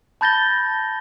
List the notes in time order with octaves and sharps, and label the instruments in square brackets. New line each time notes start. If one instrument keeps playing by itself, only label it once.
[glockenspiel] A5 B5 G6 A6 A#6 G7